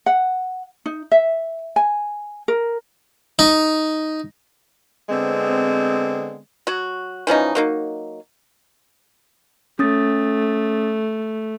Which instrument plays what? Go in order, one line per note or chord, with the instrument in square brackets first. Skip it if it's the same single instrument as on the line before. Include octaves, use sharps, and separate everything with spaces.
[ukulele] F#5
D#4
E5
G#5
A#4
[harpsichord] D#4
[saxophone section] D3 G#3 B3 C4
[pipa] F#3 F#4
E3 F3 C#4 D#4
F#3 A#3 D#4
[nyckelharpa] A3 [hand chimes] C#4 D#6 A6